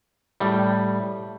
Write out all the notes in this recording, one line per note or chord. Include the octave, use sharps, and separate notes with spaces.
A2 G3